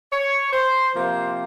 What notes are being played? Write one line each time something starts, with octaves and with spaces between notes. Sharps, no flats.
C#5
C5
C3 F3 A#3 C5